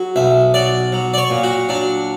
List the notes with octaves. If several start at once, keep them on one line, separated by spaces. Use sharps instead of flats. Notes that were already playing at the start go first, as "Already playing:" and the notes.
Already playing: F#3
B1 E5
F#3 D5
F#3
D5
C#5
A#2
F#4
F#3 D4